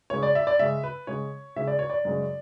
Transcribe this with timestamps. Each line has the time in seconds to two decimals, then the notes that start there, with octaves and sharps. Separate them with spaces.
0.10 C#3 G#3 C#4 C#5
0.23 D5
0.35 E5
0.47 D5
0.59 C#3 G#3 C#4 E5
0.83 B4
1.07 C#3 G#3 C#4 C#5
1.56 C#3 G#3 C#4 E5
1.67 D5
1.79 C#5
1.90 D5
2.05 F#2 C#3 G#3 C#4